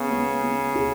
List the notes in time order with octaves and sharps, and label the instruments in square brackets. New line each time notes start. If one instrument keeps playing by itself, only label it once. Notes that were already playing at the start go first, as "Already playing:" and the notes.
Already playing: [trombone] C#3 [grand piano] B3
[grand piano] B3
B3
G#4